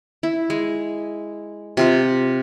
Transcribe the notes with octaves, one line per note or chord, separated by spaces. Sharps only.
E4
G#3
C3 F4 C5